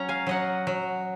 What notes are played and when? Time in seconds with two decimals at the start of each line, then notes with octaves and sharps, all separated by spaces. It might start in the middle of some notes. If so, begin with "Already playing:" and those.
Already playing: F#3 C#4 A#5
0.09 F5 G#5
0.27 F#3 D#5 F#5
0.67 F#3